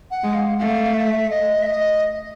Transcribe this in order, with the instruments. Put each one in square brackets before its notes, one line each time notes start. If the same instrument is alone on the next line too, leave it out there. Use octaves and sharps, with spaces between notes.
[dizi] F#5
[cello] G#3
[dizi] F5
[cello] A3 [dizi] F5
[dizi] E5
D#5
E5
D#5